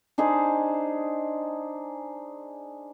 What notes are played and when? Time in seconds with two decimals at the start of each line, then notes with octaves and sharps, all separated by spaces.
0.18 D4 D#4 G#4 C5